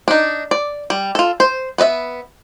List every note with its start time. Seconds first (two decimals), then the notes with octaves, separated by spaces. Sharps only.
0.08 D4 D#4
0.51 D5
0.90 G3
1.15 F4 A4
1.40 C5
1.78 B3 B4 D#5 E5